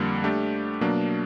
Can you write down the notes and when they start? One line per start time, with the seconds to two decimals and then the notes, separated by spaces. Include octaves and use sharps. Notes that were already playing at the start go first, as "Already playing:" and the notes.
Already playing: F2 D3 G3 A#3
0.24 A3 D4 G4
0.81 B2 F#3 A#3 D4